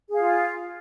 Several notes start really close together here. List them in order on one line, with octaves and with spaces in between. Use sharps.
G#4 F5 F4